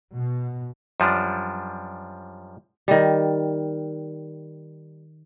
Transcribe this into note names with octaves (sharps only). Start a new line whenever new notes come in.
B2
F#2 F3 G3 D4
D#3 G3